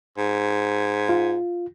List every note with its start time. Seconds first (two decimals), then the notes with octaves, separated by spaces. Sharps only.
0.18 G#2
1.09 F4